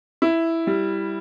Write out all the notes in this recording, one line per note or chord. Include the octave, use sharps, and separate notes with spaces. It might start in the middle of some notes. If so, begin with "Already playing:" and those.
E4
G3